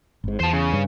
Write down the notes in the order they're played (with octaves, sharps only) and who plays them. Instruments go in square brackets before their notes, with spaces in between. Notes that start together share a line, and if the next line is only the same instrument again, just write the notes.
[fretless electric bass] G#1 G#2
[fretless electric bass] E2 [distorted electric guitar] C5 A5
[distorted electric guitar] C#3
[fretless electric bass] G2